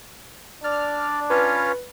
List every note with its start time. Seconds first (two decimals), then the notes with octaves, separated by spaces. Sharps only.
0.64 D4 D5 F6
1.30 C#4 F4 B4 C#5